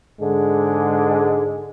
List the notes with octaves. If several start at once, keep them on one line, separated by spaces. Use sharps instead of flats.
G#2 D3 G#3